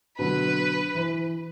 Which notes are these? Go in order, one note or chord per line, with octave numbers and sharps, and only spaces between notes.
B2 D3 F#3 B4
E3